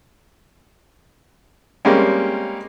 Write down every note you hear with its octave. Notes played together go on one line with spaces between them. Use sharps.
G3 G#3 A#3 C4 C#4